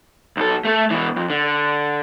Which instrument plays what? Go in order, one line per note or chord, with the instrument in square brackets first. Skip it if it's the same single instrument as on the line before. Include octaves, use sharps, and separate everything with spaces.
[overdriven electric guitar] B1 A4
A3 A4
B2 E3
F2
D3